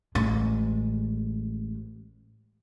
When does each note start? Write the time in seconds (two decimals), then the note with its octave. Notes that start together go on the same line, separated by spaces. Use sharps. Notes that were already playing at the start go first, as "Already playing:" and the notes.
0.15 A1 G#3